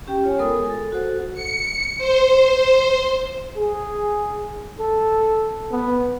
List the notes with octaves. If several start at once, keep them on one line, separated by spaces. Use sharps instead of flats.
C#4 G4 G5
F4 C#5 G#5
G#3 B3 A4 A#4 G#5 D#6
G#4
A4
F#4 A4 C5 F#5
C#7
C5
G#4
A4
B3